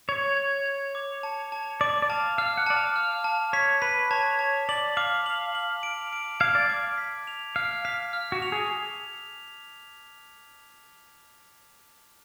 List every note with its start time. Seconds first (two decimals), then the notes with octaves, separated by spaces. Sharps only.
0.09 C#5 G#6
0.37 G#6
0.66 G#6
0.95 D6
1.23 A5
1.52 A5
1.81 D5 D6
2.02 D5
2.10 F5 A5
2.38 F5 F6
2.57 F#5
2.66 D5 A5
2.76 F5
2.96 F6
3.24 A5
3.53 C#5 B6
3.82 B4 B6
4.11 C#5 A5
4.39 A5
4.69 D5 F#7
4.97 F5 D6
5.26 F#7
5.55 F#7
5.83 D7
6.13 D7
6.40 F5 G#6
6.55 D5
6.69 F5 D6
6.98 B6
7.27 F7
7.56 F5 F6
7.85 F5 B6
8.13 F6
8.32 F#4
8.42 F7
8.52 G#4